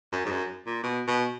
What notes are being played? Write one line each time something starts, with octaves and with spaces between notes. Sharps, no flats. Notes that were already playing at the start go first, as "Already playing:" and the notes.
F#2
G#2
F#2
A#2
B2
B2